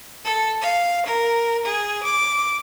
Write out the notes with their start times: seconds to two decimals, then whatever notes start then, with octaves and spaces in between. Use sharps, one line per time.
0.25 A4
0.61 F5
1.06 A#4
1.66 G#4
2.04 D6